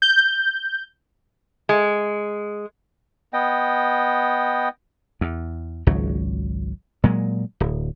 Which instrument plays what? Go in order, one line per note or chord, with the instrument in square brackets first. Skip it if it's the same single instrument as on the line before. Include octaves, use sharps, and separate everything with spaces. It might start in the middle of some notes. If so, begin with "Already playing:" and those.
[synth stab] G6
[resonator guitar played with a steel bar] G#3
[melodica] B3 D#5 G5
[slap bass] E2
G#1 C#2 F#3
A#2 F#3 G#3
D1